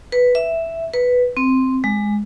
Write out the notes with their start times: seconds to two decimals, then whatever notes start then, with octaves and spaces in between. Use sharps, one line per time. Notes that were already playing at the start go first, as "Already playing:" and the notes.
0.12 B4
0.35 E5
0.94 B4
1.37 C4
1.84 G#3